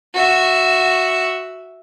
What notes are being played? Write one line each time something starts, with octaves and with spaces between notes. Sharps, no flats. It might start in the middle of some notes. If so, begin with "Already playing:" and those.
F#4 E5